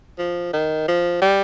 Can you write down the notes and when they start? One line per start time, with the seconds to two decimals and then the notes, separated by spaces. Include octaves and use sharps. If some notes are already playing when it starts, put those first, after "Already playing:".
0.18 F3
0.53 D#3
0.88 F3
1.22 G3